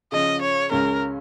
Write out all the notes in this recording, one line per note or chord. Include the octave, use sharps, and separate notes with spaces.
C#3 F3 C#4 D#5
C#5
C#2 C#3 G#3 C#4 A#4